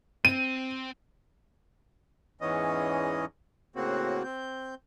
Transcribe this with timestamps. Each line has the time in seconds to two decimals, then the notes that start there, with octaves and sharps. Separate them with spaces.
0.25 C4 D#7
2.41 E2 G#2 E3 B3 C#4 D#5
3.76 A2 C#3 A#3 C4 F#4
4.24 C4 G6